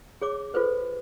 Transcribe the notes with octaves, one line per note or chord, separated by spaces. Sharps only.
G#4 C#5 D6
F4 A4 B4 C5